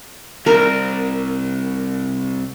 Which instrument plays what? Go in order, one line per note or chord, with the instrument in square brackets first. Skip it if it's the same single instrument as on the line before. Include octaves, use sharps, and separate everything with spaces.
[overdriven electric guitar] C2 [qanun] A#4